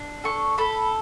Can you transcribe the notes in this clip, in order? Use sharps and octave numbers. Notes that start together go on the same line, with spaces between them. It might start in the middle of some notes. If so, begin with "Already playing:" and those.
Already playing: D4
A4 C#6
A4 B5